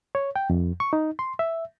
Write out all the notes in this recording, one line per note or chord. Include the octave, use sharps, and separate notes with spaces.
C#5
G5
F2
C#6
D#4
C6
E5